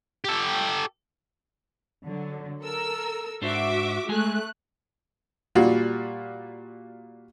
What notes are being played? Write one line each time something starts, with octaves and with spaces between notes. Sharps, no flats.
G4 A4
D3 F#3
A4 A#4 E6
G#2 D4 F#4 C5 E5 D6
G#3 A3 G#4 G#5 F#6
A#2 G3 F4 F#4